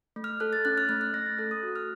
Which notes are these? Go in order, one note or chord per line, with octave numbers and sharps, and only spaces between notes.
A3
F6
A4 F#6
A6
C#4 F#6
F6
A3 F#6
F#6
A3 A#6
A6
A4 F#6
D#6
F#4
F6